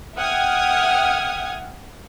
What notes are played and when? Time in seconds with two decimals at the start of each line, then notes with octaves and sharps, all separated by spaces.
0.16 E5 F#5 G5 D#6 F6 G#6